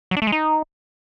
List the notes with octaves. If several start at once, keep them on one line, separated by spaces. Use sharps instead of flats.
F#3
D4
A3
G#3
D#4